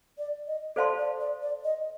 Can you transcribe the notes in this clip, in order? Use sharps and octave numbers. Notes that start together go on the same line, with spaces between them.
D5
D#5
A4 C5 D5 F5 A5 C6
D5
D5
D5
D#5